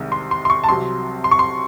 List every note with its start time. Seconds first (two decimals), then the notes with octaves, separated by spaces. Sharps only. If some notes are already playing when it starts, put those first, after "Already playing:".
Already playing: C2 C3 D#3 G#3
0.12 C6
0.31 C6
0.45 C6
0.50 C#6
0.64 A5
0.69 C2 C3 F#3 C6
1.24 C6
1.31 C#6
1.39 C6